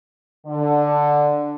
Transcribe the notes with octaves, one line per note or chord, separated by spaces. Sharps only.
D3